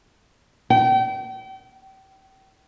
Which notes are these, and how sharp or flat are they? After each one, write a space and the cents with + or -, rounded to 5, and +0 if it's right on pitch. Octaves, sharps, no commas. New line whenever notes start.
G5 -35